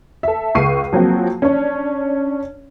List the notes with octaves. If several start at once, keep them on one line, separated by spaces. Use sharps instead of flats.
A4 E5
C#2 C#6 C7 D#7
F3 F#3 A#3 C4 F#4
C#4 D4 C#5